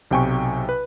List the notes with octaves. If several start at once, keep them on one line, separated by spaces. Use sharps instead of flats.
B1 C3 G5 G#5 C#6
B4